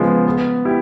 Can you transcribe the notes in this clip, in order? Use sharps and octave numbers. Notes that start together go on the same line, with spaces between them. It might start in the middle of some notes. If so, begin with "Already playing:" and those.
Already playing: C#3 F3 G#3 B3
B3
E4 G4